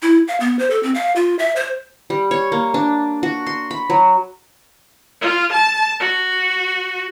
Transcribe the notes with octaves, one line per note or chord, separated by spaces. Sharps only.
E4
F5
B3
C5
A4
C4
F5
F4
E5
C5
G3
C#5
A#3
D4
F#4
C6
B5
F#3
F4
A5
F#4